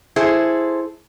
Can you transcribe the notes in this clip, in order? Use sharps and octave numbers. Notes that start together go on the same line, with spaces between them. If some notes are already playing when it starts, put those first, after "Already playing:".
E4 G#4 A4 C5